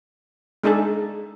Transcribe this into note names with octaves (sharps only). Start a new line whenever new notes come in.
G#3 D4 D#4 G#4 A4